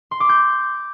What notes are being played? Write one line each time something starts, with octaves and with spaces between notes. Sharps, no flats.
C6
D6
G6